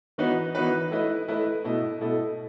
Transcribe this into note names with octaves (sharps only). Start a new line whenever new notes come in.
E3 B3 D#4 F#4 B4
E3 B3 D#4 F#4 B4
A3 E4 B4 D#5
A3 E4 B4 D#5
B2 A3 E4 A4 D#5
B2 A3 E4 A4 D#5